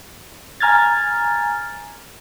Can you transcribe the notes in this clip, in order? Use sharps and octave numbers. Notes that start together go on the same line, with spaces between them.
G#5 A#5 F6 G#6 A6